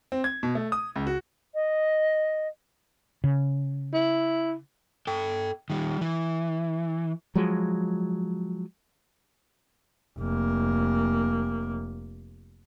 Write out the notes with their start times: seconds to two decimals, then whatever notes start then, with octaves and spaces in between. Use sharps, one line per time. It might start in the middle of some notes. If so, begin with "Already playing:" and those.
0.12 C4
0.24 G#6
0.43 B2
0.55 A3
0.72 D#6
0.96 C#2
1.07 F#4
1.55 D#5
3.24 C#3
3.94 E4
5.07 A4 G5
5.70 D#3 G3
6.01 E3
7.36 F3 F#3 G#3
10.19 F1 A#3